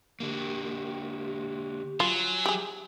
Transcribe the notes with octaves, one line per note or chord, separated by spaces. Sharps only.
D3 A#3 G4
F#3 F4 G#5
G4 G#4